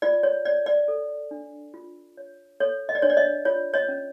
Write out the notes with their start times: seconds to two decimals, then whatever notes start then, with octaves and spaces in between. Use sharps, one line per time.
0.02 F4 D5
0.23 C#5
0.45 C#5 D5
0.66 D5
0.88 A4
1.31 D4
1.74 F4
2.17 C#5
2.60 A4 C#5
2.89 D#5
2.95 D5
3.02 D4 C#5
3.10 D5
3.17 C#5 D#5
3.45 F4 C#5
3.74 C#5 D#5
3.88 C#4